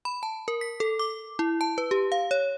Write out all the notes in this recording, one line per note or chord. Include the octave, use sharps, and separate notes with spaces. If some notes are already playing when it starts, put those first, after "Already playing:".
B5
A5
A#4
B6
A4
D6
E4
A5
B4
G4
F5
C#5